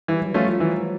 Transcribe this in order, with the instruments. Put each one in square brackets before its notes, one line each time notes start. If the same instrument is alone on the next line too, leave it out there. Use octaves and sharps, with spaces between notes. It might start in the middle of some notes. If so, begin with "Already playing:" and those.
[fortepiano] E3 [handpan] G3
[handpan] F#3
[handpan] F3 [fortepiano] A3 C#4 F4
[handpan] F#3
[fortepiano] E3